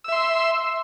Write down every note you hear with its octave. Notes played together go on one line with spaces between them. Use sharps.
E5 C6 E6